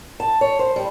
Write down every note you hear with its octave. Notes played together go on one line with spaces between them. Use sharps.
A5
C#5
C5
G3